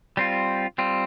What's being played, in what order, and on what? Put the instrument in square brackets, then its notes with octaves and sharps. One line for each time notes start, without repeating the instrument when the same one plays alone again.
[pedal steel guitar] G3 C4 F4
G3 C4 F4